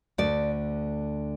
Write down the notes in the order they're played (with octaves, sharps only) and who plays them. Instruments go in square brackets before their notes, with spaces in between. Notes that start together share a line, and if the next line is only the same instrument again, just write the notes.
[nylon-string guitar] D2 D3 D5